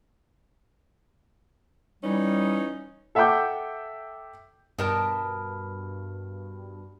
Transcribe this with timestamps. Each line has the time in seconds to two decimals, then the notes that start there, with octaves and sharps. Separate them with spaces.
2.03 E3 G3 C#4 D#4
3.15 A4 E5 F#5 G5 D6 G6
4.78 G2 B2 A#4 A5